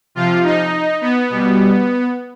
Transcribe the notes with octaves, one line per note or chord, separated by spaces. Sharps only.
C3 F3 F4
D#4
B3
B2 G3